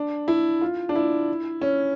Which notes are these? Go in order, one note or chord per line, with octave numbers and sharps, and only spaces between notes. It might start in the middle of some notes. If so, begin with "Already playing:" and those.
Already playing: D4
E4
F4
D4
E4
C#4